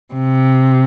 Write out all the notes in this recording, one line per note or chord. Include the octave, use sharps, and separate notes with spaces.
C3